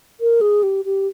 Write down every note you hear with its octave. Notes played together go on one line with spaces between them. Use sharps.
A#4
G#4
G4
G4